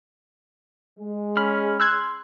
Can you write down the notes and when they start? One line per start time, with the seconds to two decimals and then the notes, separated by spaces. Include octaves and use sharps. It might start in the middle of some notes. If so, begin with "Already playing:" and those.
0.99 G#3
1.37 C#4 B5 F6
1.80 C6 E6 F#6 G#6